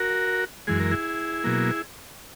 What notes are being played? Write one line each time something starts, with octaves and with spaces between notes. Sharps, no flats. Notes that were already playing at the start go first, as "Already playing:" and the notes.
Already playing: F#4 A#4
F#2 E3 G#3 G#4
A#4
E4 G#4
B2 F#3 A#3